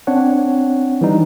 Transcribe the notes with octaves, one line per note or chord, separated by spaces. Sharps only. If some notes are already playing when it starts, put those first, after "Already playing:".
C4 D4 C#5 F#5
E3 G3 D#4